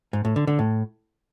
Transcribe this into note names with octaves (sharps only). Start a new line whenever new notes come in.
G#2
A2
D3
D3
A2